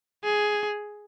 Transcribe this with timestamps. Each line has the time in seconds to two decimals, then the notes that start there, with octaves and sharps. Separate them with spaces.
0.24 G#4